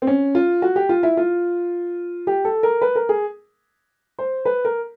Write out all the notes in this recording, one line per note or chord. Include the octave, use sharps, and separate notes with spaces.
C4
C#4
F4
F#4
G4
F4
E4
F4
G4
A4
A#4
B4
A#4
G#4
C5
B4
A#4